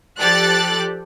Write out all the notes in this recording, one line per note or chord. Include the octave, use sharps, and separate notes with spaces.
F3 G4 A4 D5 F#6 A6